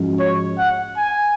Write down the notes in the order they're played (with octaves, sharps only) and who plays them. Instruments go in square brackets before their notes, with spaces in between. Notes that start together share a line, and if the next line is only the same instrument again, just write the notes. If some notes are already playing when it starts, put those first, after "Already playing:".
Already playing: [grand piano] G#2 F3 G#3 C#4 F#4
[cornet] C#5
F#5
G#5